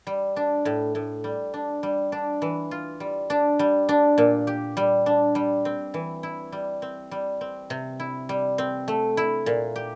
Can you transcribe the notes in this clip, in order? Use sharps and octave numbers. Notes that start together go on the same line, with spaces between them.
G3
D4
A2
A2
G3
D4
G3
D4
E3
F4
G3
D4
G3
D4
A#2
G4
G3
D4
G3
C4
E3
E4
G3
C4
G3
C4
C3
E4
G3
C4
A3
E4
A#2
G4